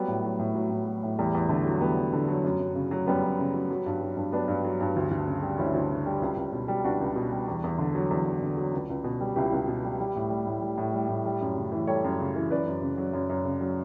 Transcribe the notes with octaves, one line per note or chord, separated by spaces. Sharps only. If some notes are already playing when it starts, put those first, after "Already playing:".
Already playing: F#3 G3 B3
A2
F#3
A2
F#3
A2
F#3
A2
E2 G3
E2
D3 A3
F#3
E2 G3 B3
E2
D3
F#3
F#2
F#2
C#3
F#3
F#2 G3 B3
F#2
C#3
F#3
F#3
G2
F#3
G2
F#3 B3 D4
G2
F#3
G2
D2
D2
C#3
G3
D2 C#4 E4
D2
C#3
G3
C#2
C#2
B2
G3
C#2 D4 F#4
C#2
B2
G3
E2
E2
D3
F#3
E2
E2
D3
F#3
C#2
C#2
B2
G3
C#2 E4 G4
C#2
B2
G3
G3
A2
G3
A2
G3
A2
G3
A2
G3
F#2
C#3
E3
G3 A4 C#5
F#2
C#3
E3
F#2 B4 D5
F#2
C#3
F#3
F#2
F#2
C#3
F#3